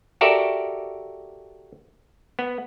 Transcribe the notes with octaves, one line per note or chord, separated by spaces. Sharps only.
F#4 G4 A4 A#4 D5 E5
B3